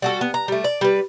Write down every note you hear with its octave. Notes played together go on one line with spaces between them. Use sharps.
G3 F#4 A4
B3
A#5
G3 A3
D5
G3 B4